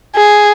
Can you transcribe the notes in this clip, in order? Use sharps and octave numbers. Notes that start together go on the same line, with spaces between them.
G#4